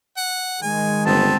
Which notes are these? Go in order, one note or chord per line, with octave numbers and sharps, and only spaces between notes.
F#5
D#3 G#3 G#5
G1 B3 C4 A5